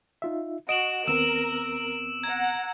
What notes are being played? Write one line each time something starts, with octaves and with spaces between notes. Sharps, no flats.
D#4 F4 E5
F#4 D#5 D7 E7 F#7
D#2 B3 C4 A#4 E6 E7
F#5 A#5 G#6